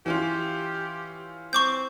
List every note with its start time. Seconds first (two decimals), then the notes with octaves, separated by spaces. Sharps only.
0.06 E3 C#4 F4 G4
1.53 C4 C#6 D6 G6